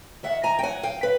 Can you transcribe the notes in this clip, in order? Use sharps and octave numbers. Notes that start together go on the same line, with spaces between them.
D#3 E5 F#5
G#5 A#5
G5
F#3 F#5 G#5
F5 G5
B4